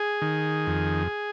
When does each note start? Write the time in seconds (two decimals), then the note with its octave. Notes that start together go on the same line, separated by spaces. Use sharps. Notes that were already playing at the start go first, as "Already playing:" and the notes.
Already playing: G#4
0.22 D#3
0.67 F2